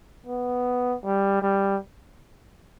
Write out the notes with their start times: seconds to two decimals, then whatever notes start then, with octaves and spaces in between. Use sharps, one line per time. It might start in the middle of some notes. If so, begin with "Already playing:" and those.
0.27 B3
1.04 G3
1.42 G3